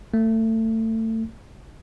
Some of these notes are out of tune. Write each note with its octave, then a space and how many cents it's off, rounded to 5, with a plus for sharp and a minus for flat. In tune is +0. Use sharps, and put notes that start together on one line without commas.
A3 +25